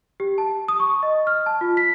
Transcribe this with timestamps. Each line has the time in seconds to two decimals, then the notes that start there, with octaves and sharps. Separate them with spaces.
0.20 G4
0.38 A5
0.68 D#6
0.80 C#6
1.03 D#5
1.27 F6
1.46 A5
1.61 F4
1.77 B6